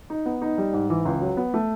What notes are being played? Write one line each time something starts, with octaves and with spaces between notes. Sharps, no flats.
D#4
B3
D#4
G3
G#2
E3
C#2
F#3
B3
A3